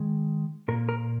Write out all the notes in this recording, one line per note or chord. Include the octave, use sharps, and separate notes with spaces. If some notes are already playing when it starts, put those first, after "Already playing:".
Already playing: D#3 G#3
A#2 A#3 A#4
A#4